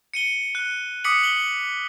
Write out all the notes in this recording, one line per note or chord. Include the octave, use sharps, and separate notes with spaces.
C#7 D#7 G7
F#6
D6 D#6 B6 C#7 F#7
F#7 G7